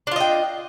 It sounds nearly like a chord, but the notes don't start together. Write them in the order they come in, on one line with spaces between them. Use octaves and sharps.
D4 F4 D#5 G5